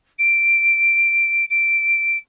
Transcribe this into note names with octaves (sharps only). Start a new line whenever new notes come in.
D7
D7